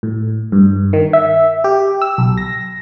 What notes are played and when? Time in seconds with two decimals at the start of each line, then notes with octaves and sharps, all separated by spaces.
0.03 A2
0.52 G2
0.93 D#3
1.13 E5
1.64 G4
2.02 E6
2.18 B1
2.38 A#6